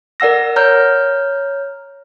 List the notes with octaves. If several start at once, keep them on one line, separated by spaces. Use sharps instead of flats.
A#4 D5 F#5 E6 A#6
C#5 A#5 F6 G6